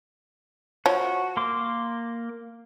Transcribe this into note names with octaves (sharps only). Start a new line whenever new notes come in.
F3 F#4 C#5
A#3 C6 D6